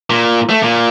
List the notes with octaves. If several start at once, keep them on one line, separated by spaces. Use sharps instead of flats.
A#2
A3
A#2